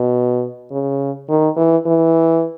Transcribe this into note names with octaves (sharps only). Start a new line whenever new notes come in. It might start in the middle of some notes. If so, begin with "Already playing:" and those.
Already playing: B2
C#3
D#3
E3
E3